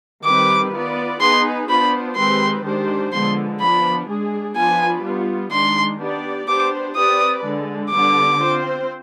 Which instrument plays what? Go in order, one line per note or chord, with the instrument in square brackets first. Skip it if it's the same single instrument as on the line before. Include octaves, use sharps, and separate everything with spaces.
[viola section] D#3 G3 C4 G4 B4 [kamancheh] D6
[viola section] B3 F4 B4 D5
[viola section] B3 D#4 G#4 B4 [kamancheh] C6
[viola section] B3 D4 F4 C5 [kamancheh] B5
[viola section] D#3 G#3 C4 G4 B4 [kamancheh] C6
[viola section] D#3 G#3 D4 G4 C5
[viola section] D3 F3 G#3 B3 [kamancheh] C6
[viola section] F3 B3 D4 [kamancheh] B5
[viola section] G#3 D4 G#4
[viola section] F3 B3 D4 F4 B4 [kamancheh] G#5
[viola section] G3 B3 F4
[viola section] D#3 G#3 D4 [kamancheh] C6
[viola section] B3 D4 G4 D5
[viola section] B3 D4 G4 C5 [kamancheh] D6
[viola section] C4 G4 B4 D5 [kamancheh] D#6
[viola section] D3 G#3 D4
[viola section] D3 G3 B3 [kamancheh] D6
[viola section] C4 F4 C5